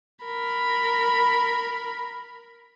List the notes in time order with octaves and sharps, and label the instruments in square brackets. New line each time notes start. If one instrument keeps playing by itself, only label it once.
[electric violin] A#4 B5